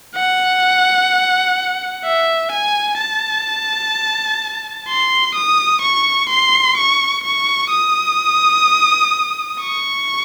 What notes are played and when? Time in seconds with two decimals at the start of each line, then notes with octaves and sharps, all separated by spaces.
0.16 F#5
2.05 E5
2.52 G#5
2.99 A5
4.89 C6
5.35 D#6
5.82 C#6
6.30 C6
6.78 C#6
7.24 C#6
7.71 D#6
9.61 C#6